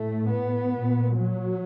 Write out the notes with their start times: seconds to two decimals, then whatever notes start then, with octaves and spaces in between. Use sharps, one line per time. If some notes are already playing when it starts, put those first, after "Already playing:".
Already playing: A2 A3
0.29 B3
0.73 A#2
1.16 F#3